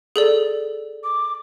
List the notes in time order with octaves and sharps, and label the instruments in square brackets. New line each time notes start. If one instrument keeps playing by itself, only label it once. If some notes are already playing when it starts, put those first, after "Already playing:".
[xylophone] G#4 A4 D5
[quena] D6